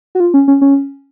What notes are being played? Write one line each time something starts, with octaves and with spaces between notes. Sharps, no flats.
F#4
F4
C#4
C#4
C#4